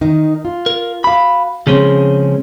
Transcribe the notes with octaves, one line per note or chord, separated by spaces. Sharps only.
D#3 D#4
F4
A#4
F#4 F5 B5
C#3 F3 G#3 C4 C#4 G#4